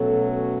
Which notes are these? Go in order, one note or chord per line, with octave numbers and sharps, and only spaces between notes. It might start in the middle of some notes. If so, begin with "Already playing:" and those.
Already playing: B2 F#3 A3 C#4 A4